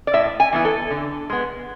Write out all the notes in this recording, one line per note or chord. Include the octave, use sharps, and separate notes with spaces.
D5
A2 E5
G#5
E3 B3 E4
A4
D3
G#3 B3